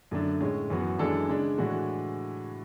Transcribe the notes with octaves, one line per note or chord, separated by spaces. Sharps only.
F#2 D3 A3 D4
A2 G#3 C#4
F#2 E3 B3 F#4
F#2 E3 G#3 D4 A4
C#3 G#3 D4
A2 E3 G#3 D4 F#4